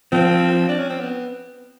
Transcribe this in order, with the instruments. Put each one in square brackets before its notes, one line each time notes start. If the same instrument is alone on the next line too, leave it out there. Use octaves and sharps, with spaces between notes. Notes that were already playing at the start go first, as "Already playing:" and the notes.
[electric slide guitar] F3 [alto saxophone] C4
[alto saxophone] D4
C#4
C4
B3